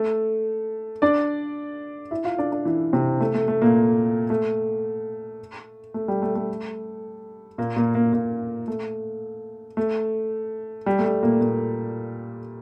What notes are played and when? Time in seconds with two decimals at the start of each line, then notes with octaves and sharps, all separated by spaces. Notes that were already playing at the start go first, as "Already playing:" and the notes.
Already playing: A3 A4
1.02 D4 D5
2.11 E4 E5
2.24 F4 F5
2.38 D4 D5
2.52 D4 D5
2.65 E3 E4
2.93 C3 C4
3.21 A3
3.34 A3
3.48 A3
3.62 A#2 A#3
4.30 A3
5.94 A3
6.08 G3
6.22 A3
6.35 A3
7.58 A#2 A#3
7.76 A#2 A#3
7.94 A#2 A#3
8.13 A#2 A#3
8.68 A3
9.77 A3
10.86 G3
10.99 A3
11.05 G3
11.23 A#2 A#3
11.41 A#2 A#3